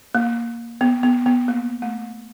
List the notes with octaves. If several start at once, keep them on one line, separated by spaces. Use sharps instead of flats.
A#3
B3
B3
B3
A#3
A3